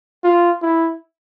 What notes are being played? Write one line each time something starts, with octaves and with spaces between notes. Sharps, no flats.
F4
E4